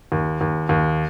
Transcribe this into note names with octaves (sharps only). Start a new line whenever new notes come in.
D#2
D#2
D#2